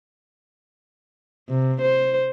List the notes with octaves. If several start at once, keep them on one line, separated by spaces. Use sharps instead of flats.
C3
C5